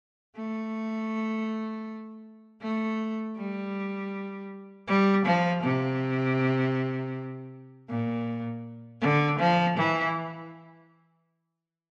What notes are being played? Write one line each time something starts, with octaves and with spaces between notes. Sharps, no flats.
A3
A3
G3
G3
F3
C3
A#2
D3
F3
E3